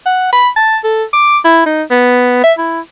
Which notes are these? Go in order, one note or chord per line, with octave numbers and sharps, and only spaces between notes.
F#5
B5
A5
A4
D6
E4
D#4
B3
E5
E4